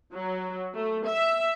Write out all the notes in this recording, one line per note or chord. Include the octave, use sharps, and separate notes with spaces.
F#3
A3
E5